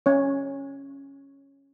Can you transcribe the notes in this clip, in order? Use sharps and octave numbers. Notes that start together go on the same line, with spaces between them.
C#4 C#5